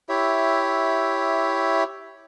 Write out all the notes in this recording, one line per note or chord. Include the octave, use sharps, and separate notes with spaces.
E4 G4 C#5 E5